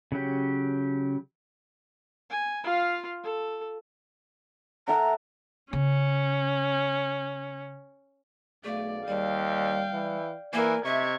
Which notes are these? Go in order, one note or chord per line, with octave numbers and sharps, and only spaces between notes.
C#3 F#3 G4
G#5
F4 F5
A4
A4 E5 F#5 A#5
C#3 C#4
B1 A3 G#4 D5 F5
D#2 G3 D5 F5 G5
E3
E3 A#3 A#4 G#5
C3 D#5 E5 C#6 G#6